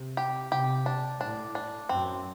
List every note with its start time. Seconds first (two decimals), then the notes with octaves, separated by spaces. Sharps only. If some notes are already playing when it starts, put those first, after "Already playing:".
Already playing: C3
0.17 G4
0.52 C3 G4
0.86 D4
1.20 A2 D4
1.55 D4
1.89 F#2 C4